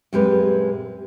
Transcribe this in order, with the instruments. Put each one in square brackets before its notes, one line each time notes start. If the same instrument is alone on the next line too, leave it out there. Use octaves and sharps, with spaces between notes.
[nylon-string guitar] F#2 A#2 G#3 C4 G4 B4